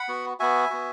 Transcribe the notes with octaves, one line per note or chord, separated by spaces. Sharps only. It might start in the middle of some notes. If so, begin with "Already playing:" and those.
Already playing: F#5 B5
B3 F#4
B3 F#4 E5 G#5
B3 F#4